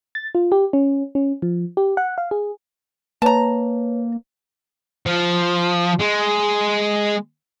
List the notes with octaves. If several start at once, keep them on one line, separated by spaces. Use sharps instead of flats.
A6
F4
G4
C#4
C#4
F3
G4
F#5
F5
G#4
A#3 B4 C#5 A5 A#5
F3
G#3